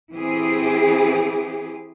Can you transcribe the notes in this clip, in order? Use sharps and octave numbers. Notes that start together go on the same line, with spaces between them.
E3 C4 G4 G#4